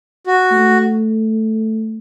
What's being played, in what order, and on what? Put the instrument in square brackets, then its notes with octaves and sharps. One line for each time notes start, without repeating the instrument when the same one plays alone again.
[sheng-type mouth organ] F#4
[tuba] A3